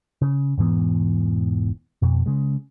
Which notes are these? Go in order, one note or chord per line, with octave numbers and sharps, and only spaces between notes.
C#3
E1 G#2 E3 B3
F2 B2
C#3 G#3